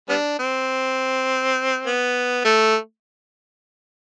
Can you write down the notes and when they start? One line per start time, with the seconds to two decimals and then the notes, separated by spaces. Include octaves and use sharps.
0.09 G3 B3 D4
0.39 C4
1.86 B3
2.45 A3